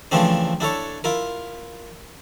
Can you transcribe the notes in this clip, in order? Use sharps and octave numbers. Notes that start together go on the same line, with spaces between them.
C#3 E3 F3 A3 C4 D4
D4 E4 A4 C#5
E4 F4 A#4